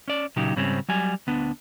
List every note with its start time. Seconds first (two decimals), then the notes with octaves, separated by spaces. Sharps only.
0.08 C#4 D5
0.36 A#2 C#3 F#3 D#4 G4
0.56 G#2 C#3 G3 C4 C#4
0.88 F#3 G3 G#5
1.27 D2 B3 D4